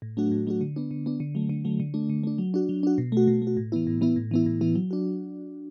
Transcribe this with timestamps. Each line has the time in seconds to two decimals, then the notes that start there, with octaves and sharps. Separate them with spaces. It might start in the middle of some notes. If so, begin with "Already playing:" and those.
0.02 A2
0.17 F#3 A3 D4 F#4
0.31 A2
0.47 F#3 A3 D4 F#4
0.61 D3
0.76 B3 D4
0.91 D3
1.06 B3 D4
1.20 D3
1.35 F#3 A3
1.49 D3
1.65 F#3 A3
1.80 D3
1.94 A3 D4
2.09 D3
2.23 A3 D4
2.38 F#3
2.54 D4 F#4
2.69 F#3
2.83 D4 F#4
2.98 B2
3.12 A3 F#4
3.27 B2
3.42 A3
3.47 F#4
3.57 A2
3.72 E3 B3 E4
3.87 A2
4.01 E3 B3 E4
4.16 A2
4.31 E3 B3 E4
4.46 A2
4.61 E3 B3 E4
4.75 F#3
4.91 D4 F#4